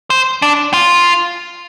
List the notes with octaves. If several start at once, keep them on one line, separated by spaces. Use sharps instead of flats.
C5
D4
F4